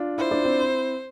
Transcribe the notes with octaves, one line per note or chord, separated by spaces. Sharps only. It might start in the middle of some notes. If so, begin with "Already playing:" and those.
Already playing: D4 F4
E4 C5
D4
C4 E4